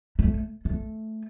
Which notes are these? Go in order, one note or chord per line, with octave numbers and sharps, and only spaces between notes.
A3
A3